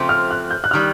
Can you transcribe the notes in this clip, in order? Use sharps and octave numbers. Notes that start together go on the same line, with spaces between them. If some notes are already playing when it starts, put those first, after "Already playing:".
Already playing: F2 C#3 F3 A3 C4
F6
F#6
G6
F#6
D#3 G3 F6